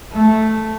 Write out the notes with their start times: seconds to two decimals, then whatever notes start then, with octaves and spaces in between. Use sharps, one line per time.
0.12 A3